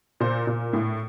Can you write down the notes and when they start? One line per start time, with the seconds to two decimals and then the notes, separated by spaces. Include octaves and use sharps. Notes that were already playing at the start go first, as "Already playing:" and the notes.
0.20 A#2 C5
0.47 A#2
0.73 A2